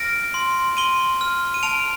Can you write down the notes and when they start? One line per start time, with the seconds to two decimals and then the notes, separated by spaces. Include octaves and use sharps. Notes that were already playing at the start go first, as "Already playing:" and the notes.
Already playing: F6 A#6 D7
0.34 C6
0.77 C6 D#7 G7
1.21 F6
1.54 D#7
1.63 A5 D7 F7